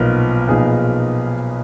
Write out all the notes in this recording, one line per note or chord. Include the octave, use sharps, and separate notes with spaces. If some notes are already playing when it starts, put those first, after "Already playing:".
Already playing: B1 A#2 F3 B3 D#4 A#4
B1 A#2 F3 B3 D#4 G#4